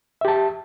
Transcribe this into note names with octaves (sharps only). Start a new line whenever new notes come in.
G4 E5 A5